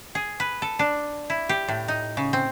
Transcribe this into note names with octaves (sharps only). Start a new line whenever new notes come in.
G#4
B4
A4
D4
E4
G4
A2
D#4
C#3
C4